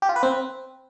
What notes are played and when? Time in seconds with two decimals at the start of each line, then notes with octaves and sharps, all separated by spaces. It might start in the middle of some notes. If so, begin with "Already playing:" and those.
0.02 G4
0.09 F4
0.16 B4
0.23 C4